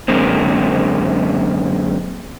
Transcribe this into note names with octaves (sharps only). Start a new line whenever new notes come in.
F#2 D3 G#3 A#3 C4